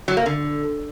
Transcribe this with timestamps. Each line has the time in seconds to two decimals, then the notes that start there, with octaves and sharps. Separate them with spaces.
0.08 F#3
0.17 A#3
0.26 D3